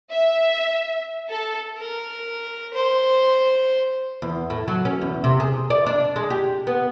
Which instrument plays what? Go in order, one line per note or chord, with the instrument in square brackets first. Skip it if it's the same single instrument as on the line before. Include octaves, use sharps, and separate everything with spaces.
[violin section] E5
A4
[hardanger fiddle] A#4
C5
[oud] E2
A2
F#3
C#4
E2
C3
G#4
D5
D4
G#3
G4
B3